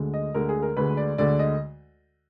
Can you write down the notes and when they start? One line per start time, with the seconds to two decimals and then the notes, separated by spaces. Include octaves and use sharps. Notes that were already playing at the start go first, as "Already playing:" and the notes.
Already playing: D2 D3 G#3
0.14 D#5
0.34 D2 D3 G#3 A#4
0.49 G#4
0.63 A#4
0.77 D2 D3 G#3 B4
0.97 D5
1.18 D2 D3 G#3 D5
1.39 D#5